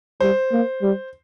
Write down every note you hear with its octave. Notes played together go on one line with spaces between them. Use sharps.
G3 C5
A#3
G3